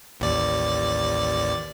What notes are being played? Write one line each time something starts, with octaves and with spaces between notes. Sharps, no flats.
A1 D#2 D5